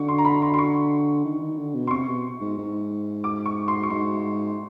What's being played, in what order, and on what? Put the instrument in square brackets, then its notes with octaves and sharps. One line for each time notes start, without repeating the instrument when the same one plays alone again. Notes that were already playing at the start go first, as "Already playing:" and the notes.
Already playing: [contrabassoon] D3 [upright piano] C#6
[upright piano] C6
A#5
B5
C6
C6
C#6
[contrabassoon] D#3
D#3
D3
B2
[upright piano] C6
[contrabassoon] C3 [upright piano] C#6
[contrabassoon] B2
G#2
G#2
[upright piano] D6
C#6
C6
C#6
[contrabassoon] G#2 [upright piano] C6